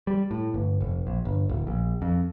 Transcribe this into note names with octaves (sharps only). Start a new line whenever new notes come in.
G3
A2
G1
F1
A#1
G1
D1
A#1
F2